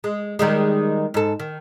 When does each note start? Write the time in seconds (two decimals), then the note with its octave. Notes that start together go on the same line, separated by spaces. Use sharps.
0.04 G#3
0.39 D#3 G3 G#3
1.14 G#2 A4
1.40 D#3